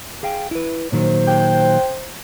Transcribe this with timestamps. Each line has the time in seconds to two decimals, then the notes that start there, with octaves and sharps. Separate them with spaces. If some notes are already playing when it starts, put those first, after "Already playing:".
0.23 G#4 F5 G5
0.51 E4 B4
0.92 A#2 D#3 F#3 C5
1.27 G5